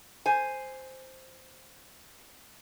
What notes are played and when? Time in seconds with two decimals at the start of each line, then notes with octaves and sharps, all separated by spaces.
0.26 C5 G#5